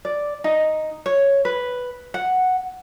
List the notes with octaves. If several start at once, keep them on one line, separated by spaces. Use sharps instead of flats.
D5
D#4
C#5
B4
F#5